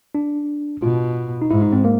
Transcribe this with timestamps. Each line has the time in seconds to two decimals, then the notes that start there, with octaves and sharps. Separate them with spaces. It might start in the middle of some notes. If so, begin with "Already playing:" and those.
0.15 D4
0.82 B2 F4
1.42 D#4
1.51 G#2 E4
1.62 D#4
1.73 C4
1.85 A#3